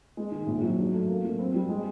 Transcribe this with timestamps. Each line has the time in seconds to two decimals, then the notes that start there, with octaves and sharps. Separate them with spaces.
0.17 G#3
0.31 D#3
0.46 A#1
0.62 F#3
0.78 D4
0.93 A3
1.08 A#3
1.24 F#3
1.39 C4
1.54 G3
1.69 G#3